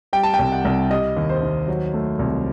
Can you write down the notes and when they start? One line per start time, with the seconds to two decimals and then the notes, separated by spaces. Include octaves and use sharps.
0.13 G3 G5
0.23 A5
0.34 G5
0.39 C2
0.52 F#5
0.65 C2
0.90 G3 D#5
1.17 D#2
1.30 C5
1.42 D#2
1.68 F#3
1.94 A3
2.19 C2